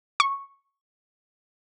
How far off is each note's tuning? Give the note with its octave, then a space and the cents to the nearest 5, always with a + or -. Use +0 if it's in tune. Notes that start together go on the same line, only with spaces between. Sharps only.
C#6 -5